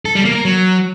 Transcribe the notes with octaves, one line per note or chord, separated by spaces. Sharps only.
A4
G3
A#3
A#4
F#3